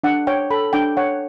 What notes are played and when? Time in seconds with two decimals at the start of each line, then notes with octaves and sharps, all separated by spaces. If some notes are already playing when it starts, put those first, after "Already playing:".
0.04 D4 F#5
0.27 C#5 G5
0.50 A4 B5
0.73 D4 G5
0.97 C#5 F#5